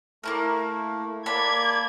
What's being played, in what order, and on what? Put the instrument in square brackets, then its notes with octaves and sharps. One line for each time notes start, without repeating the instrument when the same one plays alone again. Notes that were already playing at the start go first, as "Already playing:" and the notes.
[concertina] A3 [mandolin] A#3 E4 A#4
[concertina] A#3 D5 A5 [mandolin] B5 [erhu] G#6